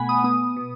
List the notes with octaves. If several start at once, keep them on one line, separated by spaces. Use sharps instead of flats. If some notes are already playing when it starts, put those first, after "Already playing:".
Already playing: B2 A3 B3 F#5 G#5 B5
D#6
B3 D#6
B2